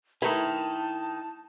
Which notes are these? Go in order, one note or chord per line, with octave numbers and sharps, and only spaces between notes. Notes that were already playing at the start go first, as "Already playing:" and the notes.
D#3 A3 D#4 E4 A#4 B4 A5